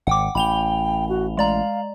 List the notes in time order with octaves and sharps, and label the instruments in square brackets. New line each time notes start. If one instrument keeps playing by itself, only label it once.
[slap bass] G#1 [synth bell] F#5 G5 D6
[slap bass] A1 [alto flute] G5 [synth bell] B5 F7 G7
[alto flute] F#4
[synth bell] G#3 D5 A#5 [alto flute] F5